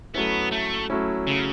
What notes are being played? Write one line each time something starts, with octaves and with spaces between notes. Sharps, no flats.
F#3 A3 B3 C#4 E4
A3
F#3 A3 C#4 E4
C#3